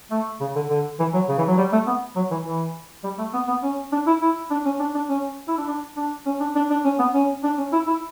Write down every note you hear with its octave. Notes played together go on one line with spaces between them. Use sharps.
A3
C#3
D3
D3
E3
F#3
C#3
E3
F#3
G3
A3
B3
F#3
E3
E3
G3
A3
B3
B3
C#4
D4
E4
E4
D4
C#4
D4
D4
C#4
E4
D4
D4
D4
C#4
D4
D4
D4
C#4
B3
C#4
D4
C#4
E4
E4